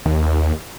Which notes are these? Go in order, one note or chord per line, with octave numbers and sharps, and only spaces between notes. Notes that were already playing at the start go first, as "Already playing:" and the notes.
D#2